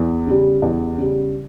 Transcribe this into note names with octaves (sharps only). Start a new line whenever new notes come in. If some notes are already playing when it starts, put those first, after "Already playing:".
Already playing: E2
C#3 G3
E2
C#3 G3